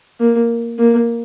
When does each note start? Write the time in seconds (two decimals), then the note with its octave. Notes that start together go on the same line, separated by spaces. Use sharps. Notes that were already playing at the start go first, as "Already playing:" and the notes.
0.20 A#3
0.78 A#3